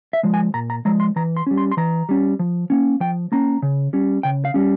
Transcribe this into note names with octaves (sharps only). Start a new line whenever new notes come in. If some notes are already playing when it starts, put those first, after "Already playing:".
E5
F3 G#3
G#5
A#2 A#5
A#5
F3 G#3 A#5
C6
E3 A#5
C6
G3 C#4
C6
C6
E3 A#5
G3 C#4
F3
A#3 C#4
F3 G5
A#3 C#4 A#5
C#3
G3 C#4
C#3 G5
F5
G3 C#4